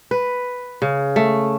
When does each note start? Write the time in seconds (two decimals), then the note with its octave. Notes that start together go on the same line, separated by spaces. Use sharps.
0.11 B4
0.82 C#3
1.16 A3